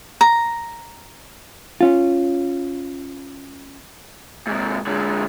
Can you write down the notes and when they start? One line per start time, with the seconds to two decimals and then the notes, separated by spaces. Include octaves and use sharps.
0.21 A#5
1.81 C#4 F4
4.47 G#2 C3
4.87 D3 G#3